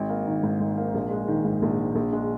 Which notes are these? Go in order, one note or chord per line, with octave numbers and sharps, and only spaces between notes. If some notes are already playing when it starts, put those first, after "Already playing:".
Already playing: G#1
A#3
D#3
G#2
G#1
A#3
A#1
G#3
D#3
G#2
A#1
G#3
A#1
G#3